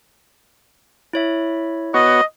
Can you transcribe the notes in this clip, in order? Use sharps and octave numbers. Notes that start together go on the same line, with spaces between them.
E4 C#5 E5
B3 F#4 C#5 D#5